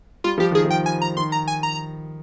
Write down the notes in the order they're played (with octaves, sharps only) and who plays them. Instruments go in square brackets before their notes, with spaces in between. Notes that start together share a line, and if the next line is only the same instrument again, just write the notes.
[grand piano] G3 [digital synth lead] F4
[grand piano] F3 [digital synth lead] G4
[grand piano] D#3 [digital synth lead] G#4
[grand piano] F3
[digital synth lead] G5
G#5
A#5
[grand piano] D#3 [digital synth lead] C6
[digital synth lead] A#5
G#5
A#5